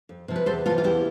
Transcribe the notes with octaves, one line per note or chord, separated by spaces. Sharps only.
F2
C3 F3
B4
E2 A4 C5
C3 E3 F4 A4
F4
E2 E4 G4